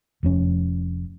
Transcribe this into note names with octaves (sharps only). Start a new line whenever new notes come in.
F1 F2 C#4